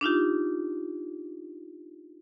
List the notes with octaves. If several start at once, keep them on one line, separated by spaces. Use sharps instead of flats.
D4 D#4 F4 G4